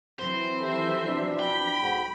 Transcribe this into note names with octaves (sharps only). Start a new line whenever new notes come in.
E3 F#3 C4 C5
D#3 G4 A4 E5
B2 F3 D4
G5 B5
B1 G#2 F#4